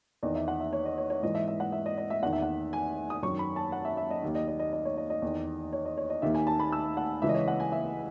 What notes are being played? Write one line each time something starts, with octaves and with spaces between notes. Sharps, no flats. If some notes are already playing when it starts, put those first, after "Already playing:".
E2 D#3 D#5
E5
F#5
E5
C#5
D#5
C#5
C#5
G#2 E3 D#5
E5
E5
F#5
E5
D#5
D#5
E5
E2 D#3 F#5
E5
F#5
G#5
D#6
F#2 D#3 C#6
B5
A5
F#5
E5
E5
D#5
D#2 D#3
D#5
D#5
D#5
D#5
C#5
D#5
D#5
E2 D#3
C#5
D#5
C#5
D#5
D#2 D#3 E5
G#5
A5
B5
E6
F#5
C#2 C#3 E3 E5
D#5
C#5
F#5
G#5
E5